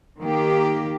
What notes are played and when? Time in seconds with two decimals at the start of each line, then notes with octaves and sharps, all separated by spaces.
0.20 D#3 A#3 G4